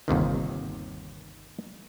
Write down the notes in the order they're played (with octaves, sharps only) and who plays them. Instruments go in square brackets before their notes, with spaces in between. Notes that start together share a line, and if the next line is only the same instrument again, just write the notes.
[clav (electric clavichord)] G1 D#2 C3 D#3